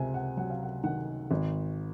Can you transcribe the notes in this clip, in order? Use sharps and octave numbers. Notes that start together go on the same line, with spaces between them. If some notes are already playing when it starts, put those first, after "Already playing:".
Already playing: C#2 C3 G#5
F#5
F#3 F#5
F5
F#5
D#3 F#5
G#1